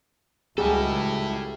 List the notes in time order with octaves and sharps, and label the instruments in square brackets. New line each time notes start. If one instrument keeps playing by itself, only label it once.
[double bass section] C#2 [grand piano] F#3 G3 F#4 [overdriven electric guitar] E4 A4 [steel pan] G#4